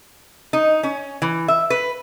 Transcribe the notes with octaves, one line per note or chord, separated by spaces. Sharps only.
D#4
C#4
E3
E5
B4